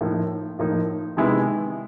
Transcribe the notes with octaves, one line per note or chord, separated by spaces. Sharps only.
A2 F3 A#3 D#4
A2 F3 A#3 D#4
C3 D#3 G#3 B3 E4